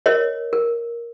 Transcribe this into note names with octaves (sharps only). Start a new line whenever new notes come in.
A#4 C#5 D#5
A#4